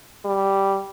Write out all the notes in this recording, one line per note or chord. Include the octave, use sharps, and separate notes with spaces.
G3